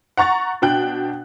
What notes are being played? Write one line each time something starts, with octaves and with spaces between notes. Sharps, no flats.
F#5 A#5 C#6 A6
B2 D4 G5 F#6